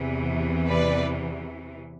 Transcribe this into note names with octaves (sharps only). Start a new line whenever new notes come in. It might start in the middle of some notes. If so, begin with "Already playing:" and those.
Already playing: E2 C3 E3
B4 D5